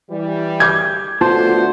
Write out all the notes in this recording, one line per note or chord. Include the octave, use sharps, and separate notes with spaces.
E3 G3
D6 G6 G#6
D3 A3 B3 F4 F#4 C5 A5